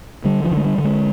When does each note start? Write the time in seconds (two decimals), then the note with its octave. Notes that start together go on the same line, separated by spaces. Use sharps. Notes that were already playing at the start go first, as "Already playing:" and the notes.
0.25 D3 G3
0.44 F3
0.51 D3
0.57 G#3
0.65 G3
0.78 D3
0.84 G#3